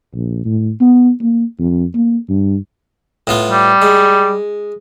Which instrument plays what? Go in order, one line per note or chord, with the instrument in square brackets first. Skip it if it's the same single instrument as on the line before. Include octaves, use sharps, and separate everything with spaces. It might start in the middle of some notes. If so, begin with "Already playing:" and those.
[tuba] A#1
A2
B3
A#3
F2
A#3
G2
[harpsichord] A2 B3 F4
[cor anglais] G3
[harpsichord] G#3